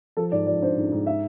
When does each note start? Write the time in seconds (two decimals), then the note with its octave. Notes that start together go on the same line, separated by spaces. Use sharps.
0.17 F3 A4
0.32 G#2 D5
0.47 F3 D5
0.62 D4 C5
0.77 G#2
0.92 G#2
1.06 E5